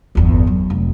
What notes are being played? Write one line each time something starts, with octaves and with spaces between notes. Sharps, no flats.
G1 E2
F#3
F1